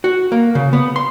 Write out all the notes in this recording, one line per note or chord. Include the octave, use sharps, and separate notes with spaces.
F#4
A#3
C#3
B3
C6